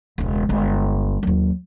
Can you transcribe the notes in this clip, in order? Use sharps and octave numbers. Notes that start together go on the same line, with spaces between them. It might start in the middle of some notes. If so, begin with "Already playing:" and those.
E1 C#2
G1 G#3
D#2 F#3